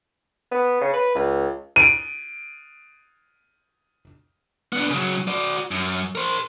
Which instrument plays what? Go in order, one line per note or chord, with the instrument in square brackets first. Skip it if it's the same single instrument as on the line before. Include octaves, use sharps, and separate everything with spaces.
[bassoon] B3
C#3
B4
C#2
[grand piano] D7 D#7
[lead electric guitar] B3 D4
C#3 F#3
F#4 D5
F#2
A#4 C5